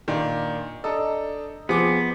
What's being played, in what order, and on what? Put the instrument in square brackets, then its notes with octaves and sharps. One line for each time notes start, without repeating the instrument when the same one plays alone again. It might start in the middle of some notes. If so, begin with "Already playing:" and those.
[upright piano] A#2 D#3 D4
[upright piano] D4 A4 [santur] D#5 A#5
[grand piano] F3 [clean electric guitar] B3 [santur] C4 [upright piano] G#4 D6